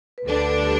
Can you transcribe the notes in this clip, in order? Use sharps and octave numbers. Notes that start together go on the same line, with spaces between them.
B4
D2 D3 G3 D4 A4
G4